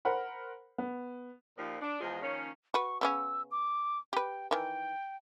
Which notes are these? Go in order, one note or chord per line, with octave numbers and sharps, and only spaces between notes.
A#4 C5 F#5 B5
B3
D#2 A#2 F3
D4
E2 G#2 F3 G#3 F4 G#4
D#3 F3 A#3 C#4
F#4 B4 C#6
C#3 B3 C#4 E6
D6
G4 B4 G5
D#3 E3 G5